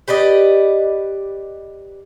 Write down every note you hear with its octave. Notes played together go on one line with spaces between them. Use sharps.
G4 B4 D5 D#5